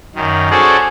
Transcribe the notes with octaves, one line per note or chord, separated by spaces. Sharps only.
F#2 D#3
C#4 F#4 G#4 A4 C5 D5